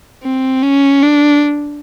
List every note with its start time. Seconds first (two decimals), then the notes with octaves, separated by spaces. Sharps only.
0.23 C4
0.63 C#4
1.03 D4